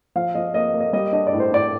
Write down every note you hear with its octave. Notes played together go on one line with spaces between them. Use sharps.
F3 F5
F3 D#5
A#3 D#5
A#3
D#5
G3 D#5
D4 D#5
D5
A2
C5
A2 D5